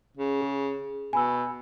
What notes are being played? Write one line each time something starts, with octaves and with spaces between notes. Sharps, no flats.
C#3
G#4
B2 G#5 B5 E6